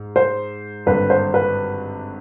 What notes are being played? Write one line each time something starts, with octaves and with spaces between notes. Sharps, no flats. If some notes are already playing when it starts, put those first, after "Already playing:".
Already playing: G#2
C5
G#1 G2 D3 G3 A#3 B4
C5
B4